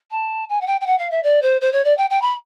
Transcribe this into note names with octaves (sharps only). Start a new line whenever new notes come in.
A5
G#5
F#5
G5
G5
F#5
F5
E5
D5
C5
C5
C#5
D5
G5
G5
B5